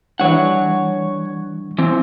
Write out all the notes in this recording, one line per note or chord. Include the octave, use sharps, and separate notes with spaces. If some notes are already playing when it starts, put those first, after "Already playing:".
E3 G3 D4 C#5 F#5
E3 C4